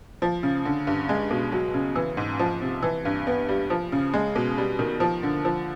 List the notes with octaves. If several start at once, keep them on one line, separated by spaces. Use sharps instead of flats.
F3
C#3
D3
G2
G#3
B2
F#3
C#3
E3
G#2
F3
C3
E3
G2
B3
G3
F3
C#3
G#3
B2
G3
D#3
F3
D3
F3